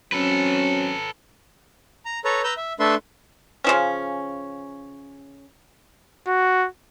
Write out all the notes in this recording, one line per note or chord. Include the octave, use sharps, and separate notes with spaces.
F#3 C4 C#4 A4 B4
A#5
A4 B4 C#5 A#5
B4 A#5 E6 G6
E5
A3 D4 A4 B4 E5 C6
C#3 F3 C#4
F#4